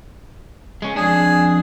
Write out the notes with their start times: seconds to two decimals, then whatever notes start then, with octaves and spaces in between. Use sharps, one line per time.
0.82 G#3 C#4
0.96 F2 D4 G#4